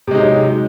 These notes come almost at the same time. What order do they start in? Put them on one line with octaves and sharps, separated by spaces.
C3 G#3 D#4 F#3